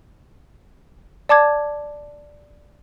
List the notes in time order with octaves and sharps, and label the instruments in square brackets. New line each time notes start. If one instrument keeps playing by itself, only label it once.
[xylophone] D5 A5 D6 G#6